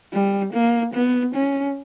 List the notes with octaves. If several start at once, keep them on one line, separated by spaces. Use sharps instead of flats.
G3
A#3
B3
C#4